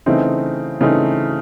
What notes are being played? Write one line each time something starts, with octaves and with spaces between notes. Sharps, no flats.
C#3 E3 A3 C4 D#4
C#3 E3 A3 C4 D#4